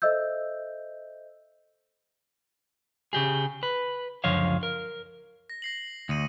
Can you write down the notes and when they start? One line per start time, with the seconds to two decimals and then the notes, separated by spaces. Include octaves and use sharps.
0.02 A4 C5 D#5 E5 E6 G6
3.13 C#3 G4 G#4
3.63 B4
4.24 C#2 F#2 D3 F3 C#5 F5
4.63 A#4
5.50 A#6
5.62 A#6 C7 F#7
6.09 D2 D#6 C#7 D#7